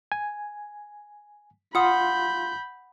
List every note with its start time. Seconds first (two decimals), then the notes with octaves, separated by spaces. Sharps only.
0.12 G#5
1.75 F4 F5 F#5 B5 C6 D#6 G6